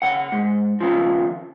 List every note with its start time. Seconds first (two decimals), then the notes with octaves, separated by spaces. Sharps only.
0.02 C#3 F#5
0.32 G#2
0.80 D#2 C#3 F3